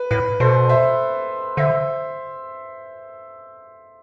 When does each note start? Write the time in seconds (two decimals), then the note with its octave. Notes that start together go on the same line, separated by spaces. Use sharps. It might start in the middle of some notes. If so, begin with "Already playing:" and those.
Already playing: B4
0.11 A2 B4
0.40 B2 A4 C5
0.69 C5 E5
1.57 D3 C5 E5